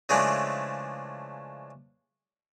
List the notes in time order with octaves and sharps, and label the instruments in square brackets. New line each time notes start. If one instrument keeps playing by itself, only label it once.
[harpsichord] C#3 E3 F3 G#3 A3 D4